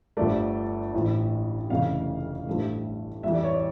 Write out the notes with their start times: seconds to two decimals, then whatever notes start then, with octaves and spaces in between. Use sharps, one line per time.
0.17 G1 G2 F3 A3 D5
0.94 A1 A2 F3
1.70 F1 F2 C#3 E3 F5
2.47 A1 G2 F3 A3
3.23 F2 E3 G3 E5
3.34 D5
3.44 C#5
3.54 D5